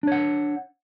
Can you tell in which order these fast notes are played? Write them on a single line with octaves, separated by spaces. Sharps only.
D4 C#5 F#5